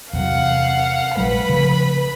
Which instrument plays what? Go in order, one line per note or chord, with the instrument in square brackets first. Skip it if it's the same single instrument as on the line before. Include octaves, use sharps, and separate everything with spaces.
[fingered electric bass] E2 C3 F#3 [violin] F5 F#5
[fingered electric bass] A#1 F#3 G#3 [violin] B4 B5
[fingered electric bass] C#3 F3 A3